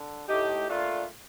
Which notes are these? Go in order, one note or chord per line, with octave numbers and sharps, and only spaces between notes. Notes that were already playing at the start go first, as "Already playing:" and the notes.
Already playing: D3
A2 A3 D#4 G4
A#2 A3 D4 F4